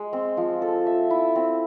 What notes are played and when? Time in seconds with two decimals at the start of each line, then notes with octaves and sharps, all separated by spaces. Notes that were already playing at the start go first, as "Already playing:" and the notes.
Already playing: G#3
0.13 C4
0.37 F3
0.62 A4
0.87 E5
1.11 E4
1.36 C4